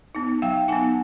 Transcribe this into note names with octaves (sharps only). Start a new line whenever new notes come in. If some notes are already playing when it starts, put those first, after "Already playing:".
B3 D#4
F#3 F5 G5
B3 D#4 F#5 G#5